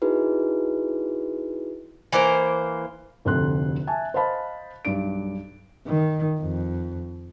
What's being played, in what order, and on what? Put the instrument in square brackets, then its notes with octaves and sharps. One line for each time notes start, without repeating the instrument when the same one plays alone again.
[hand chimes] D#4 E4 F#4 G#4 B4
[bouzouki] E3 A#3 C5 A#5
[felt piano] F1 D2 C3 A4 C6 F#6
E5 G#5 A5
C5 D#5 F5 A5 B5
B1 G2 D5 D7
[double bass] D#3
F2